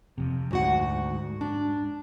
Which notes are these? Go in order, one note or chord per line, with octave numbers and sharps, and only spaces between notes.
F2 C3
D2 G#2 F#4 F#5
D4